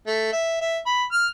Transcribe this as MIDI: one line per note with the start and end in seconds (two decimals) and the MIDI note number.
0.07 0.28 57
0.33 0.59 76
0.61 0.78 76
0.86 1.04 83
1.12 1.26 89